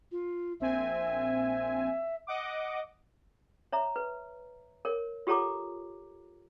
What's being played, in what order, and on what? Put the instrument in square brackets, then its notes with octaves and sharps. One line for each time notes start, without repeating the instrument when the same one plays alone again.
[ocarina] F4
[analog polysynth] A#1 C4 G#5 [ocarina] E5
[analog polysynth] D#5 F#5 D6
[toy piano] C#5 E5 A#5
B4
A#4 C#5
F4 G4 A4 C#5 A#5 D6